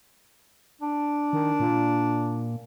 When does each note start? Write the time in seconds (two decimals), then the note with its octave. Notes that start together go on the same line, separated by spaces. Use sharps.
0.81 D4
1.33 D#3
1.60 A#2